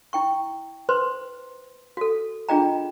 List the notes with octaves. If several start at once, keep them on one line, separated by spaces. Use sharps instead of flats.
E4 G5 C#6
B4 C5 C6
F#4 A4
D4 F4 G#4 D#5 G5 A#5